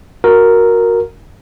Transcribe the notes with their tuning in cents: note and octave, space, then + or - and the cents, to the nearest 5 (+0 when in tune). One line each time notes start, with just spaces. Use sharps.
F#4 -10 A#4 +0